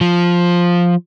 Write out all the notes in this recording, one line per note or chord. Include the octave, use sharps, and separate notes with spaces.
F3